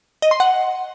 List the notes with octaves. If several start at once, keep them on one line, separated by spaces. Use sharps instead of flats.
D#5
C6
F#5